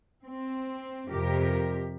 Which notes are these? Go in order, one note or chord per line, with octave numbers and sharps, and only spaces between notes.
C4
F2 C3 G4 A#4